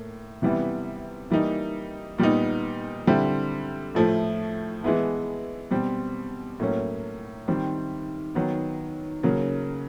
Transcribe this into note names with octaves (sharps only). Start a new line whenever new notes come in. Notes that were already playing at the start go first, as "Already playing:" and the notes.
Already playing: A2 A#3
C3 E3 G3 B3 E4
E3 G3 A#3 D#4
A#2 G3 B3 D#4
D3 G3 C4 E4
A2 F3 A3
E3 G#3 B3 E4
B2 G3 C4
A2 F#3 A#3 C#4
D#3 G3 C4
D#3 F#3 B3
C#3 F#3 A#3